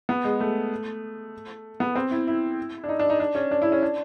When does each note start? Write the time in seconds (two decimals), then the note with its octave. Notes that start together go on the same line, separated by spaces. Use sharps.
0.09 B3
0.24 G#3
0.40 A3
1.80 B3
1.95 C4
2.11 E4
2.27 E4
2.84 D4
2.89 D#4
2.99 D4
3.10 D#4
3.20 D4
3.35 C#4
3.51 D4
3.62 E4
3.72 C#4
3.83 D4